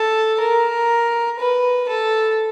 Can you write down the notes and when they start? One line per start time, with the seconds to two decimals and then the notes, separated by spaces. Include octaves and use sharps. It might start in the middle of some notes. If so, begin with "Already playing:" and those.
Already playing: A4
0.40 A#4
1.40 B4
1.89 A4